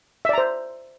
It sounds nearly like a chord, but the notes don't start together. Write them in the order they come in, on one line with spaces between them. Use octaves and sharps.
E5 D5 A#5 C5